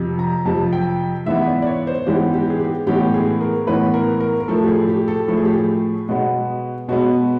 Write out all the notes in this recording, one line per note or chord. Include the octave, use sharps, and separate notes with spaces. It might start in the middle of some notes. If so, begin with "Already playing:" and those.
Already playing: F2 C3 F3
A#5
F2 C3 F3 A5
G5
G#2 E3 G#3 B3 E5
D5
D5
C#5
C5
G#2 E3 G#3 B3 G4
G4
G#4
G4
A2 E3 G#3 B3 G4
G#4
A#4
A2 E3 G#3 B3 B4
A#4
A#4
A#4
A2 F3 A3 A4
G4
G#4
G4
A4
A2 F3 A3 A4
G#4
G4
G#4
B2 G#3 B3
B2 G#3 B3 F#4